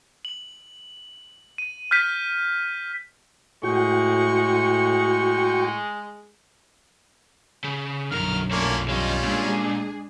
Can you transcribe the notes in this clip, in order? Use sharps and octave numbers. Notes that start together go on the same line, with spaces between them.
F#7
D#7
F6 G6 B6 D#7
A2 G#3 F#4 G5 C#6
C#3
B1 F#2 D3 A#4 F6
A3 A#3 C#4 D4 F4
D3 G3 C#4 F4 D#5
A#2 G#3 D4 G#4